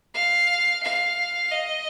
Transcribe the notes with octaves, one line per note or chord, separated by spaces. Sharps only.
F5
F5
D#5